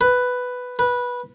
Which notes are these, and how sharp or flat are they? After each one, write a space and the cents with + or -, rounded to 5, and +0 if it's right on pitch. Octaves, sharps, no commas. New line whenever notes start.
B4 +5
B4 -15